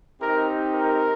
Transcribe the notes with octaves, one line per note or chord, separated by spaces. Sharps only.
C4 D#4 G4 A#4
A#4